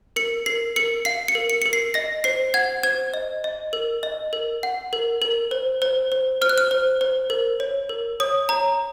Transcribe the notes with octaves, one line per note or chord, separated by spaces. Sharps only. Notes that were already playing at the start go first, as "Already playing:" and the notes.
A#4 C#7
A#4 C7
A#4 C#7
F5 C7
C#7
A#4
C#7
A#4 C#7
C7
D#5 A#6
C5 C7
F#5 G#6
C5 G#6
D#5
D#5
A#4
D#5
A#4
F#5
A#4
A#4
C5
C5
C5
C5 F6
F#6
F6
C5
C5
A#4
C#5
A#4
C#5 D#6
C#5 A#5